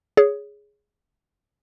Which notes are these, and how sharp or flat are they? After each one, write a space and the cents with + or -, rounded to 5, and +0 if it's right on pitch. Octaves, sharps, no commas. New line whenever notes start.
G#4 +0 C#5 +15